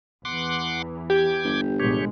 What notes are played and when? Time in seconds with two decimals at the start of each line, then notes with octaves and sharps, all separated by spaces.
0.25 E2 E3 F#5 C6 D6
1.10 G4 G5 D6 G#6
1.44 G1
1.80 A1 B2 G#3 G4 C#5